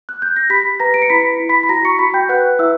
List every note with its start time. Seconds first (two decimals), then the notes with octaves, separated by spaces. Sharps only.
0.09 F#6
0.22 G6
0.36 A#6
0.50 G4 B5 B6
0.80 B4 A#5 A#6
0.94 D7
1.02 C#7
1.10 E4 B5 B6
1.40 E4
1.49 B5 B6
1.63 B6
1.69 F#4 A#5 A#6
1.85 C#6 C#7
1.99 F#4 B5 B6
2.14 G5 G6
2.29 B4 F#5 F#6
2.59 E4 E5 E6